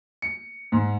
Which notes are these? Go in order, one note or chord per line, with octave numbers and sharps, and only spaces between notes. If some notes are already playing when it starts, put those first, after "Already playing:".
C#7
G#2